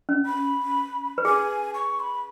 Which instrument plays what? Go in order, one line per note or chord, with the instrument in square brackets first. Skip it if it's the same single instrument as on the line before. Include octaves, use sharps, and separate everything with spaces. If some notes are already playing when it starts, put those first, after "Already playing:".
[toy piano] C#4
[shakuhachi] B5
[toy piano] B4
[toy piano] G#4 [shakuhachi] G#5
[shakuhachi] C#6
B5